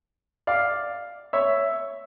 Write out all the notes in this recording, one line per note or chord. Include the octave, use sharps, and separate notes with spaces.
D5 F5
C#5 E5